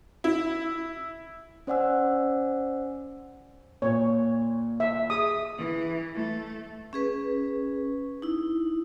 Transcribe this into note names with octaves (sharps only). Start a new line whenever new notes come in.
E4
C#4 C5 D5 F#5 G#5 E6
A#2 C#5
E5
G#4 D#6
E3
A3
C#4 G#4 B4
D#4 E4